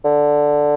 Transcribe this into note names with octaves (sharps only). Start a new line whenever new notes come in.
D3